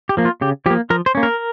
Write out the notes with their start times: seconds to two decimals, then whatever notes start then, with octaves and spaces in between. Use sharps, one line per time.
0.09 G4
0.17 F3 A#3
0.25 F4
0.41 C#3 G4
0.66 F3 G4
0.70 A#3
0.90 F3 A#4
1.06 C5
1.15 A#3 C#4
1.23 A#4